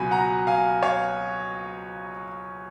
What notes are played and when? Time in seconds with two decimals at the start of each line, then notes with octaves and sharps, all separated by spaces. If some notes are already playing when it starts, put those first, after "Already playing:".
Already playing: C#2 B2 F#3 G#5 B5
0.11 F#5 A#5
0.47 F5 G#5
0.83 C#5 F5